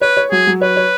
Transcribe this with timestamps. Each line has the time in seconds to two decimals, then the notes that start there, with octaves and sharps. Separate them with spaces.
0.01 B4 C#5
0.17 C#5
0.31 F#3 G#4
0.47 F#3
0.61 B4 C#5
0.77 C#5